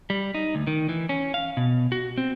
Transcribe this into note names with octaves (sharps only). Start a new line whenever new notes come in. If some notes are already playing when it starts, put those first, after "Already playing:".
G3
D#4
D2
D#3
E3
C#4
F5
B2
F#4
C4